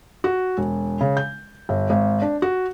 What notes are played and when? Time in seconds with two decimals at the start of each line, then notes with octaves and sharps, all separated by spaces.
0.24 F#4
0.57 E1
1.01 C#3
1.17 G6
1.69 G1
1.90 G#1
2.22 D4
2.42 F#4